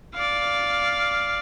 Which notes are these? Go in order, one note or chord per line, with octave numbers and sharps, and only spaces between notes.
D5 F5